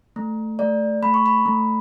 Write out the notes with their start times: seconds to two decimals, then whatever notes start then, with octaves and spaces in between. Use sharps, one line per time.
0.16 A3
0.59 A3 D5
1.02 A3 B5
1.14 C#6
1.26 B5
1.46 A3